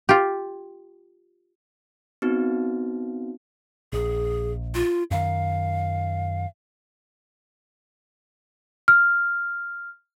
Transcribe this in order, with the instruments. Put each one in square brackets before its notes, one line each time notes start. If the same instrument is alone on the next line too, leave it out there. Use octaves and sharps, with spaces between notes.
[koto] F4 G4
[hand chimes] B3 C4 D#4 F#4
[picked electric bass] A#1 [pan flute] G#4
[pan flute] F4
[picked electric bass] F#2 D#3 [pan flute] F5
[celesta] F6